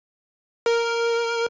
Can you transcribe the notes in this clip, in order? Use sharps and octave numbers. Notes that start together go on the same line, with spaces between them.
A#4